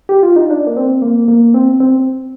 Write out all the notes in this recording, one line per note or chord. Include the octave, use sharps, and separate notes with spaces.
G4
F4
D#4
D4
A#3
C4
A#3
A#3
C4
C4